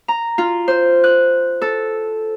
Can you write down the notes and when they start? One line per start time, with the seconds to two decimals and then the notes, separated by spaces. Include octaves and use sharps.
0.08 A#5
0.38 F4
0.68 C5
1.04 F#6
1.62 A4